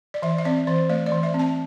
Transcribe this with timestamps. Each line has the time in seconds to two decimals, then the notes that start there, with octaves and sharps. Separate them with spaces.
0.14 D5
0.22 E3 E5
0.38 E5
0.45 C4 D5
0.67 E3 C5
0.90 A3 D5
1.06 D5
1.12 E3
1.23 E5
1.34 C4
1.39 A5